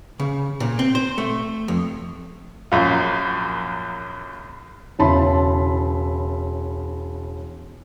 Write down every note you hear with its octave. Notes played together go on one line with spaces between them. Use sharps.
C#3
A#2
C4
C5
A3
F2
A#1 F#2 F4
E1 C#3 E4 A5 B5 C6